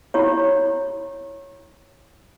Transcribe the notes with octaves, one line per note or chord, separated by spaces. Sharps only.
E4 G4 C#5